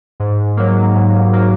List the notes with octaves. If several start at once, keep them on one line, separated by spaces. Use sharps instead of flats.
G#2
F#3 A#3
G#2
F#3 A#3